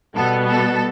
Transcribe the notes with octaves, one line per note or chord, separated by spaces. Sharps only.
B2 G3 B3 A4
A4